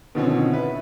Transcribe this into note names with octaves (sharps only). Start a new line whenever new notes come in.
B2 D3 D#3 F3 C4 C#4
E4 B4